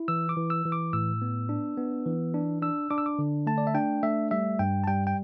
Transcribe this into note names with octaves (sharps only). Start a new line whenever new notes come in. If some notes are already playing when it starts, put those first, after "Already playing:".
Already playing: E4
E3 E6
D6
E3
E6
E3
D6
A2 E6
B3
D4
B3
E3
D4
D4 E6
D4 D6
E6
D6
D3
A3 A5
D5
E5
D4 G5
A3 E5
G3 E5
G2 G5
A5
G3 G5
G5